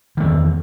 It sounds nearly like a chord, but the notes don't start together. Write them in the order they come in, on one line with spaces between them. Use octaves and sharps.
D#3 A3 E2